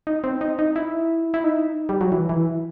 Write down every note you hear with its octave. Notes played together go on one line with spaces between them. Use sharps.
D#4
C4
D#4
D#4
E4
E4
D#4
G3
F#3
E3
E3